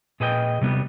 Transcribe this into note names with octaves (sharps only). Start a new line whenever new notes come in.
A#2 G#4 B4 D#5 G5
C3 G3 B3